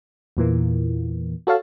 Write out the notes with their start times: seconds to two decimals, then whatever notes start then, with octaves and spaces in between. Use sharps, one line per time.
0.37 E2 A#2 E3 A#3
1.47 F#4 A4 C#5 F5 A5